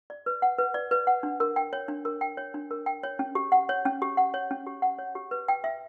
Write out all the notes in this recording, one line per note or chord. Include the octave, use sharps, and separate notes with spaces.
D5
B4
F#5
B4
D5
B4
F#5
D4
A#4
G5
C#5
D4
A#4
G5
C#5
D4
A#4
G5
C#5
C#4
G4
F#5
C#5
C#4
G4
F#5
C#5
C#4
G4
F#5
C#5
G4
B4
G5
E5